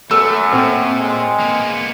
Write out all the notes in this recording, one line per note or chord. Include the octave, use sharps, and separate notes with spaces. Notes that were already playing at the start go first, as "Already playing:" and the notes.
F#2 A3 A4 E6
A#2 C4
G#3
A#3 B3